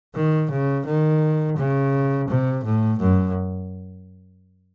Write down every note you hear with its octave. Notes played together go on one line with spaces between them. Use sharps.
D#3
C#3
D#3
C#3
C3
A2
F#2